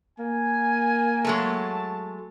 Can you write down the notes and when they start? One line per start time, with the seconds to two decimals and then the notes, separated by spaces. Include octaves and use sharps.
0.19 A#3 G#5
1.25 F#3 G#3 A3 A5